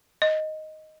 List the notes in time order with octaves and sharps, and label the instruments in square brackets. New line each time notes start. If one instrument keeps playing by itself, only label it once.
[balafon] D#5